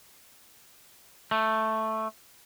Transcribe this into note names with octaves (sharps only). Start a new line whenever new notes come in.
A3